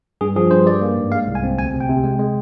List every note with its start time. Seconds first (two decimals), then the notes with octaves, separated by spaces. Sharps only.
0.21 G2 G#4
0.36 F3 G#4
0.51 G2 C5
0.66 G3 D5
0.81 A#3
0.97 G#2
1.12 G#3 F5
1.27 C2
1.35 G#5
1.43 C4
1.58 D2 G#5
1.74 C3
1.81 G5
1.89 C3
2.04 G#3
2.19 G#3